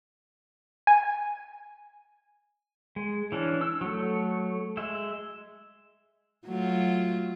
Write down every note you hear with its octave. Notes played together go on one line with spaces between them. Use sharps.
G#5
G#3
E3 C#4 D4
E6
F#3 A3
G#3 E5
F#3 A3 F4